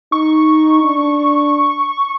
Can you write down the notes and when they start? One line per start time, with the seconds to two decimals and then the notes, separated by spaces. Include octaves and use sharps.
0.12 D#4 C#6
0.84 D4